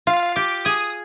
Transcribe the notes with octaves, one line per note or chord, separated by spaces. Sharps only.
F4 F5
G4 D6
G#4 D#6